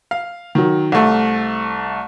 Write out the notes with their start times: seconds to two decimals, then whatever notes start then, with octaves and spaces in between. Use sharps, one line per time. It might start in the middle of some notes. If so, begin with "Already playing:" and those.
0.11 F5
0.55 D#3 F#3
0.92 C2 A3